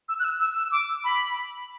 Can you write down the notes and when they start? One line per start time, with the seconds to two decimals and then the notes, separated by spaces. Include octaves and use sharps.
0.09 E6
0.19 F#6
0.24 E6
0.40 E6
0.56 E6
0.72 D6
1.04 B5